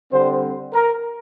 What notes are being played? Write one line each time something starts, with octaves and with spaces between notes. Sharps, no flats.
D3 G3 C4 C5
A#4